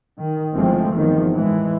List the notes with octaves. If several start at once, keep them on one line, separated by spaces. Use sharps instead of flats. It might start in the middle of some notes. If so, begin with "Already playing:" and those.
D#3
G1 E3 F3 G#3 A3 C4
G1 E2 D#3 F3
A2 E3 G#3